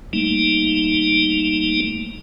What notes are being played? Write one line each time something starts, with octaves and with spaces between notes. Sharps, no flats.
G3 A3 A#3 D#4